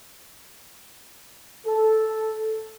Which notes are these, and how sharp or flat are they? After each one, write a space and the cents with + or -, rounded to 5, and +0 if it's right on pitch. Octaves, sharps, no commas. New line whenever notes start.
A4 -5